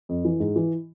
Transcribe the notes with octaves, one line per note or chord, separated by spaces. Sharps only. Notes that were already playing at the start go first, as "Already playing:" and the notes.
F2
E3
G#2
E3